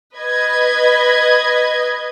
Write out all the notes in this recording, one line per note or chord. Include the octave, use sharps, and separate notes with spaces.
B4 D#5 G#6